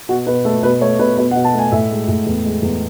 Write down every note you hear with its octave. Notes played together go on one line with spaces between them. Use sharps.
B2 F#4
B2 B4
A3 A4
B2 B4
A3 C#5
B2 B4
B2 B4
F#5
B2
A5
A3 G#5
A2 E5
G#3
A2
E2
G#3
E2